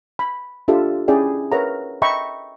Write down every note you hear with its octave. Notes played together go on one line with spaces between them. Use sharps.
B5
D4 F4 G4 A4 E5
C#4 E4 G#4 D5 E5 G5
A#4 B4 C#5 E5 F#5 A#5
D#5 E5 G5 A#5 B5 C#6